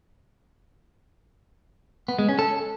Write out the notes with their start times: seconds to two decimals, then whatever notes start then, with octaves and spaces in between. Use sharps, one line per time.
2.08 B3
2.19 G#3
2.29 C#4
2.39 A4